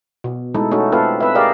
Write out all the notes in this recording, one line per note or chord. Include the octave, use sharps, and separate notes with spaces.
B2
G#3 A3 D#4 E4 A4
A3 C#4 D#4 F#4 A4
C4 F4 A4 B4 F5
C4 B4 E5
G4 G#4 A#4 D5 D#5 F5